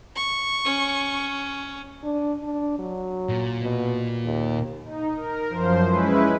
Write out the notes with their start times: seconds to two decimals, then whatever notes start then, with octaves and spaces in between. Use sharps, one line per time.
0.16 C#6
0.65 C#4
2.03 D4
2.43 D4
2.79 F#3
3.29 A#2
3.62 B2
4.24 D#2
4.85 D#4
5.16 A#4
5.49 F#2 F3 C5
5.85 G#3 C#4 E4 B4